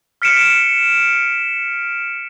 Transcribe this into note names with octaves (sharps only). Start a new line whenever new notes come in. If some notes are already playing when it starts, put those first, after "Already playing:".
F6 B6 C#7 D7 E7